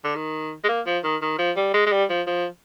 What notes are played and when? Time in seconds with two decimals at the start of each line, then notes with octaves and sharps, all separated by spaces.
0.04 D3
0.15 D#3
0.64 G#3
0.68 A#3
0.86 F3
1.04 D#3
1.21 D#3
1.39 F3
1.56 G3
1.74 G#3
1.86 G#3
1.92 G3
2.09 F3
2.27 F3